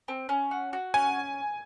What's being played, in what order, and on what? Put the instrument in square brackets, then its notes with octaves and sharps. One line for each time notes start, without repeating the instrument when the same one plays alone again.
[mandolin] C4
C#4
F#4
F#4
[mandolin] C#4 [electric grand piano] G#5